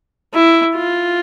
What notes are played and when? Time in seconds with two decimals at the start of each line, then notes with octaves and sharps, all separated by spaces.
0.34 E4
0.75 F4